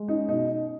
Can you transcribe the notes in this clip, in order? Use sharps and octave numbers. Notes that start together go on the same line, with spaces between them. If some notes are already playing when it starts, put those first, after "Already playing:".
Already playing: G#3
C#4 D#4
B2 D#4